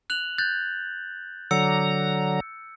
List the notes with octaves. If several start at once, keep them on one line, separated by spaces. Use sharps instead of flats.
F#6 F7 F#7
F#6 G6 A6
D3 F#3 A#5 E6 C#7